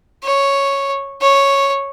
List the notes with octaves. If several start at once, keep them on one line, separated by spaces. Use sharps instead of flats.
C#5
C#5